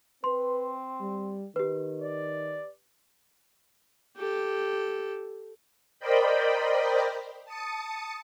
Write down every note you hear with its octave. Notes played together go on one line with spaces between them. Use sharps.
C4 B4 C6
G3
D#3 G4 B4
D5
G4 A4
A#4 C5 D5 D#5 G5 B5
A5 D#6 C#7